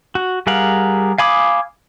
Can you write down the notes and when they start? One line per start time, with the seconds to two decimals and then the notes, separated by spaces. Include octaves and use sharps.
0.15 F#4
0.47 G3 G#4 A#4 F5 F#5
1.18 F5 G#5 B5 D6 D#6